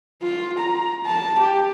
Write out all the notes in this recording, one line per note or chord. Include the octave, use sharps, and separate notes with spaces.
F4
A#5
A5
G4